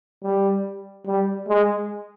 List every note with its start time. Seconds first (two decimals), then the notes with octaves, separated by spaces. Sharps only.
0.23 G3
1.07 G3
1.48 G#3